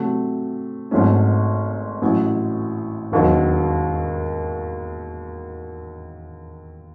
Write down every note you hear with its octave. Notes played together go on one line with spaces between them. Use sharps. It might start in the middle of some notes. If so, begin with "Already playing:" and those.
Already playing: C3 F#3 A3
G#1 G#2 F#3 A3 C#4
A1 A2 F#3
E1 D#2 D#3 F#3